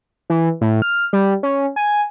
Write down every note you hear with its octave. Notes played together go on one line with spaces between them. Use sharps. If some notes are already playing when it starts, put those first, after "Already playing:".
E3
A2
F6
G3
C#4
G#5